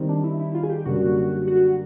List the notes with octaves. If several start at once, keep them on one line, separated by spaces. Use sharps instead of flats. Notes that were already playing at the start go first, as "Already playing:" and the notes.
Already playing: D#3 G3 C4
D4
E4
E4
F4
G#4
G4
F#2 D3 G3 A#3 F#4
F#4